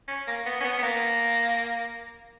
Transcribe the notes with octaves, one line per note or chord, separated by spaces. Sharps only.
C#4
A#3
B3
C#4
B3
B3
A#3